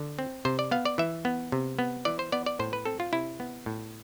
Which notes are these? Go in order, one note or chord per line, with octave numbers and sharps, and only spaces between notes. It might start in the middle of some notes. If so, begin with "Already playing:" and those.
Already playing: D3
C4
C3 C5
D5
B3 F5
D5
E3 E5
B3
C3
B3
E3 D5
C5
B3 D5
D5
A2 C5
B4
C4 A4
F4
C3 E4
B3
A2